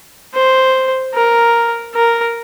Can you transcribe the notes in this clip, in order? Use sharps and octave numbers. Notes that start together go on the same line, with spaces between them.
C5
A#4
A#4